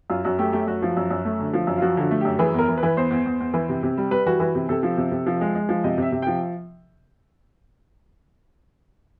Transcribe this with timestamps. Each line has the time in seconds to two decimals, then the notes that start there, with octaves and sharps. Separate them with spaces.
0.10 F#2 F4
0.24 F#2 F#4
0.38 A3 G4
0.53 A3 G4
0.67 F#2 F#4
0.82 F3
0.97 F#2
1.11 F#2
1.25 A3
1.40 D3
1.53 F3
1.67 F#2
1.78 F4
1.82 F3 F#4
1.97 D3 F#4
2.11 A3
2.21 F#2 G4
2.39 E3 G#4
2.54 E2 A#4
2.68 E3
2.78 B4
2.83 E3
2.97 E2 C5
3.11 E2
3.26 E2
3.40 E2
3.54 E3
3.69 C3
3.83 C3
3.97 G3
4.11 G3 B4
4.26 E3 F#4
4.40 E3 F#4
4.55 C3
4.69 C3 A4
4.83 F3
4.98 C3
5.11 C3
5.27 F3
5.41 G#3
5.55 G#3
5.69 F3
5.84 C3 D#5
5.98 C3 E5
6.12 C3
6.22 F3 G5